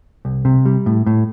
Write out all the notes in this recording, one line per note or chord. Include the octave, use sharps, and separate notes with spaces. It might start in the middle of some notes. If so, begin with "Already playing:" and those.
C2
C3
G3
A2
A2